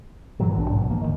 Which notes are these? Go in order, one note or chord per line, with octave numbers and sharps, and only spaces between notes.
G2 A#2 E3 F#3
A#1 C4 D4
G#2 B2
E3 A#3
D#1 B1 D#3